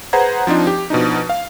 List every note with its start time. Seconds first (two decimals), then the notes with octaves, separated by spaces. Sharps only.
0.13 G#4 B4 C5 F#5 A#5 G#6
0.47 F3 C4 D4 D#4 F4
0.67 G4
0.90 B2 F3 D4 D#4
1.30 F5